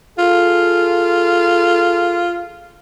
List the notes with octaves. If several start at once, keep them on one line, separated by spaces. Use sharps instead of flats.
F4 G#4 A4